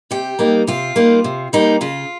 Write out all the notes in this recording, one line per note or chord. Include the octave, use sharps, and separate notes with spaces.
C3 G4
G3 A#3 D#4
C3 F4
G3 A#3 D#4
C3
G3 A#3 D#4
C#3 F4